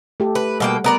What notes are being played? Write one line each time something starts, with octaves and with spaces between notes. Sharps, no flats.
A3 G4 A4
B4
B2 G3 A#3 F#5 G5
B3 A#4 D5